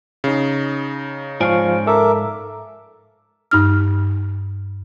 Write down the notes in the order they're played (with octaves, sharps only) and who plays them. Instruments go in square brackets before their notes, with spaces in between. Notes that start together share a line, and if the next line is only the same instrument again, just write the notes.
[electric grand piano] C#3 D#4
[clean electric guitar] G#2 D5 G#5 [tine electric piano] F3 F5 C#6
[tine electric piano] A4 [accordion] A#4 E5 D6
[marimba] G2 D#4 F6